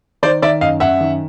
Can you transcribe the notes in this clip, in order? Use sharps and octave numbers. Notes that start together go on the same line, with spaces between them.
D#3 C5 D5
D#3 D5 E5
F#2 D#5 F5
F#2 E5 F#5
D#3